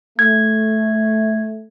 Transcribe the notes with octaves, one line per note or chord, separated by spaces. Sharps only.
A3 G#6